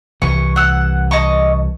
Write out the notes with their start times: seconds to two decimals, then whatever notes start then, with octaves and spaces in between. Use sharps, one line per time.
0.22 C2 E3 C#6
0.56 F#5 E6
1.11 D#5 A5 C#6